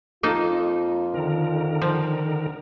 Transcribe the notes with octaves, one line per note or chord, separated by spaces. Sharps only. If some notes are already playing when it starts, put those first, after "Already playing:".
F2 A#3 D#4 F4 A4
D3 D#3 A#4
F3